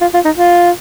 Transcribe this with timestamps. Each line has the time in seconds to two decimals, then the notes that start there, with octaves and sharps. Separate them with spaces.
0.01 F4
0.14 F4
0.25 D#4
0.38 F4